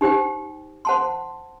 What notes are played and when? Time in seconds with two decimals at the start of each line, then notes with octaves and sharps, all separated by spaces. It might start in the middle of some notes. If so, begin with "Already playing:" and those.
0.01 D#4 G4 C5 G5
0.85 C5 F#5 A5 C6